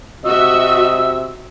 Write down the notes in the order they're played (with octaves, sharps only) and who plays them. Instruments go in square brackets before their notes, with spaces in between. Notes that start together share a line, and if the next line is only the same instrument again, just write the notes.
[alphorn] C3 [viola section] F#4 E5 [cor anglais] D#5 [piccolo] E6